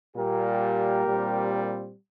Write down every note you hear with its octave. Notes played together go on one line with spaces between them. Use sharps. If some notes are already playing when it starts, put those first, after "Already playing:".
A#2 G3 A#3 G4 A#4
A#2 G3 C4